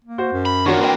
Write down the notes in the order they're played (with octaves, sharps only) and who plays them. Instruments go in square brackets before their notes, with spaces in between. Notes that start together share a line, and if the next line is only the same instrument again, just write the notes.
[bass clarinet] A#3
[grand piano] F#4 C5
[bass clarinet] F#2
[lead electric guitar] B5
[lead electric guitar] E2 D#3 [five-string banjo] C#4 F4 C#5 [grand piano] D4 F#4 A#4
[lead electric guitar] E3 A#3 [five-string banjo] C4 B4 G5